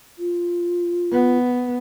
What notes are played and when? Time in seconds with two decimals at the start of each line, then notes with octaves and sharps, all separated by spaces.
0.18 F4
1.12 B3